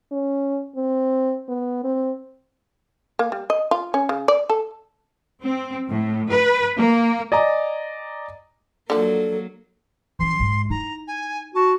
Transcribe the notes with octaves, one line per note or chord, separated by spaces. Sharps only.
C#4
C4
B3
C4
A#3
G3
D#5
F4
C#4
C#3
D5
A4
C4
A2
B4
A#3
D5 D#5 G#5 A#5
D3 F3 F#3 A#3 A4
E3 C#4 C6
G#2 G#3
D#4 E4 A#5
G#5
F#4 A5